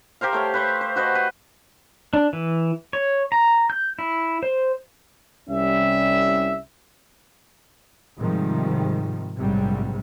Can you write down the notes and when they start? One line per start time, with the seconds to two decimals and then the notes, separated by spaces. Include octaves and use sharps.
0.21 G4 A#4 C5 F5
0.33 A3 G4 C#5 F5
0.54 B4 C5 C#6
0.81 C5
0.96 F#4 B4 C5 D#5
1.15 B4
2.13 D4
2.33 E3
2.93 C#5
3.32 A#5
3.70 G6
3.99 E4
4.43 C5
5.49 C2 G3 C#4 E5
8.20 G#2 C3 D#3 F3 G3
9.37 A#1 G#2 C3 F#3 G3